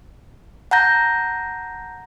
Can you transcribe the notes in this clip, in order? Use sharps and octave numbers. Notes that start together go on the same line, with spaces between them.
F#5 A5 A#5 G6 A#6